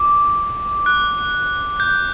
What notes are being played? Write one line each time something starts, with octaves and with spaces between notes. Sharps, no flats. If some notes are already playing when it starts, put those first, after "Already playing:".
Already playing: D6
F#6
G6